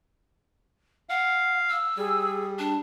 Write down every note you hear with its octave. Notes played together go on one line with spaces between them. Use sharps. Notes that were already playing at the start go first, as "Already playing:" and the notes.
F5 F#5
E6
G3 G#4
D4